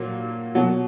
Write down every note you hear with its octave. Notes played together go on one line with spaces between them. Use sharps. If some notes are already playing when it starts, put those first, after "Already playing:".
Already playing: A#2 F#3 A#3
B2 F#3